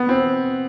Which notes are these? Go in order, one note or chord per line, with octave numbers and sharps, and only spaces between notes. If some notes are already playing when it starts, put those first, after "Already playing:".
Already playing: B3
C4